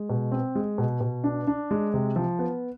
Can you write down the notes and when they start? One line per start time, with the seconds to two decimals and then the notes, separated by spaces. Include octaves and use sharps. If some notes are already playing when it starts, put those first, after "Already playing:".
Already playing: G#3
0.10 B2
0.32 C4
0.55 G#3
0.78 B2
1.01 B2
1.24 D4
1.47 D4
1.71 G#3
1.94 C3
2.16 F3
2.39 B3